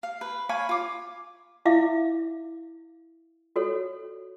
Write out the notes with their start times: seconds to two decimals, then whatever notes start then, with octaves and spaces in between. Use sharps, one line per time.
0.03 F5
0.21 B4
0.49 C#5 F5 G#5 B5
0.69 F4 D6
1.65 E4 E5 F5 D6
3.56 F#4 A4 C#5